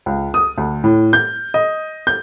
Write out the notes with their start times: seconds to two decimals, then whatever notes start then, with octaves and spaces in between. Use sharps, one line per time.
0.06 C#2
0.34 D#6
0.58 D2
0.84 A2
1.13 G6
1.54 D#5
2.07 G6